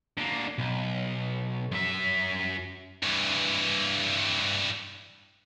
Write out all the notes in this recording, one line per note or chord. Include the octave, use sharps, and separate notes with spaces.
D3 A#3
B1
F#2 E5
G2 E3